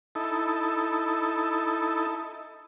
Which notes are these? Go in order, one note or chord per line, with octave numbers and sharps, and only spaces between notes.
D#4 E4 A4